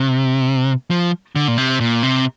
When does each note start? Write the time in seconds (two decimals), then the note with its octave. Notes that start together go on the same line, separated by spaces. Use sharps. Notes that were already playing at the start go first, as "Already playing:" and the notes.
Already playing: C3
0.91 F3
1.36 D3
1.48 A#2
1.58 C3
1.81 A#2
2.03 C3